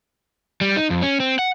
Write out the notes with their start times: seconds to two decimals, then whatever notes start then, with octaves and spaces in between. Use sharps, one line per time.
0.61 G3
0.76 D#4
0.90 F2
1.02 C#4
1.20 C4
1.39 F#5